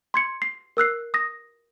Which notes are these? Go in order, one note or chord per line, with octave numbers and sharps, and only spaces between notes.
C6 G#6 C#7
C7
A#4 E6 F#6 C7
D#6 A#6